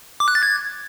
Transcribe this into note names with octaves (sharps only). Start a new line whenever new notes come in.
D6
F#6
A6
G#6